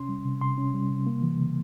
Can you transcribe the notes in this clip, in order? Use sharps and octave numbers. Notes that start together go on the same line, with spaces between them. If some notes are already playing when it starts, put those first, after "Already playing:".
Already playing: C3 C#4 C6
G3
C3
C3 C6
C#4
G3
C3
A#3
E3
C#3